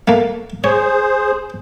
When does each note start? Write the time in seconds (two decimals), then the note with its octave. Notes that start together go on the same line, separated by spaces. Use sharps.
0.08 A3 A#3
0.64 G#4 C5 C#5